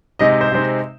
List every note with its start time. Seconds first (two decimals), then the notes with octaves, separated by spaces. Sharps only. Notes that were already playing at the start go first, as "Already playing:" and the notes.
0.19 C3 G#3 D#4 D#5
0.30 D#5
0.41 C5
0.52 C3 G#3 C4 D#4